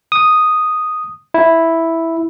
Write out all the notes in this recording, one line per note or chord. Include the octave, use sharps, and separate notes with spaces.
D#6
E4